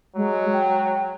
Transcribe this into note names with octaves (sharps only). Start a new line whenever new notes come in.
F#3 G#3
G5